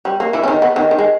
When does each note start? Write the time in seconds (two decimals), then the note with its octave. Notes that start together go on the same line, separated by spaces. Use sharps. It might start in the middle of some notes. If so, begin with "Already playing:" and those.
0.05 G3
0.20 A#3
0.33 E3 E4
0.43 C#4
0.48 D#3 D#4
0.62 B3
0.76 D#3
0.91 D#3
0.99 G#3